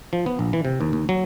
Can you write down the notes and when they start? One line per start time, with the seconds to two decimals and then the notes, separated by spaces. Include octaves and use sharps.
0.13 F3
0.26 B3
0.39 A#1
0.53 E3
0.65 C3
0.81 D#2
0.93 D#2
1.09 F#3